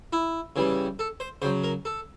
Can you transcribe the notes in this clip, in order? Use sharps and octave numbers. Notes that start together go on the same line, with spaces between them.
E4
C#3 E3 G3
A4
C5
C#3 F#3 C5
A#4
A4